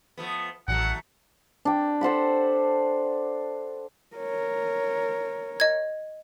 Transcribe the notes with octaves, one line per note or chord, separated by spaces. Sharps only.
F3 A3 B3
A1 D#2 F#3 A3 F#5
D4 G5
A4 C5 F#5 B5
A#4 C#5
D#5 G#6